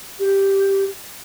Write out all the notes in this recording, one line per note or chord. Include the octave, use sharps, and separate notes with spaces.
G4